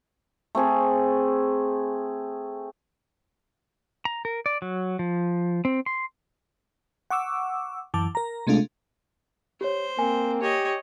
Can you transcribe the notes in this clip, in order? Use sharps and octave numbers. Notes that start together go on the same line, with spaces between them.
A3 C4 G#4
A#5
A#4
D5
F#3
F3
C4
C6
F#5 C#6 D6 E6
F#2 E3 A5 D6
A#4 A#5
C3 G#3 A3 D4 F4
G4 C5 C#5
A#3 C4 G#5
G4 C#5 D#5